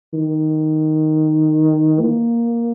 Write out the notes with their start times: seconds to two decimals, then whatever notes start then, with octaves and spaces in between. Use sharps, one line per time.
0.14 D#3
2.01 A#3